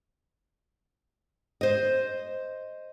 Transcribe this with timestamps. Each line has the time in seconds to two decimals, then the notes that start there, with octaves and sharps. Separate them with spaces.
1.61 C5 D#5